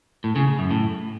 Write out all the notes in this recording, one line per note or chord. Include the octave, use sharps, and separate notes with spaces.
A2
C#3
C#3
F#2
A2